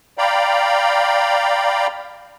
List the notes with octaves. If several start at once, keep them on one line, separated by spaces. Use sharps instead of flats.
D5 F5 G5 A#5 B5